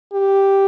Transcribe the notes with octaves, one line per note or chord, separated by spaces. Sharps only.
G4